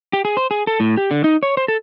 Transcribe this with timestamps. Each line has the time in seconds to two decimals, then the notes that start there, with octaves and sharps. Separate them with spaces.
0.13 G4
0.25 G#4
0.37 C5
0.51 G#4
0.67 A4
0.80 A2
0.97 G4
1.11 D3
1.24 D#4
1.43 C#5
1.57 C5
1.68 A4